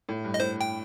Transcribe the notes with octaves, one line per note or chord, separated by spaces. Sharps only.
A2
G2
D#5
A2 C5
G5